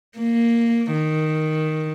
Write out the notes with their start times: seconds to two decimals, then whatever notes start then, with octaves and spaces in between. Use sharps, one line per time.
0.18 A#3
0.92 D#3